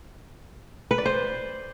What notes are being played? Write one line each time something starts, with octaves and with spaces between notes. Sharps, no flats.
B4
D5
C5